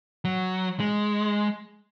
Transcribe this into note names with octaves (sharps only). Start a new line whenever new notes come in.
F#3
G#3